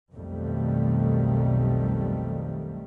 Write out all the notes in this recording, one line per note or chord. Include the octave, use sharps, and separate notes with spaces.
B1 F2 B2 D#3 G3 A3